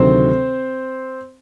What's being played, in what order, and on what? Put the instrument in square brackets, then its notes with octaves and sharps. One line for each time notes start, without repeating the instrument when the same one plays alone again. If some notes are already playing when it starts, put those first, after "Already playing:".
Already playing: [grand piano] D2 C3 D#3 F#3 C4 C5